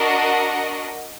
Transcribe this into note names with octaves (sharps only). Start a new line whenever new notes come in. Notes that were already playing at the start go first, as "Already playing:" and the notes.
Already playing: D4 F#4 A#4 D#5 F#5